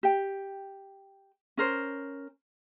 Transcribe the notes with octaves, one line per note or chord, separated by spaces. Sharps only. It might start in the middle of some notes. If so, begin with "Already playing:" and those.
G4 G5
C#4 A#4 C5